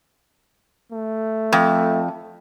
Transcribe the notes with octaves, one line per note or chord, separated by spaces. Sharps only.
A3
F2